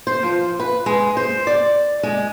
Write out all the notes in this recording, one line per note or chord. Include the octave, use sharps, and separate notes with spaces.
C5
F3
B4
G#3
C5
D5
G#3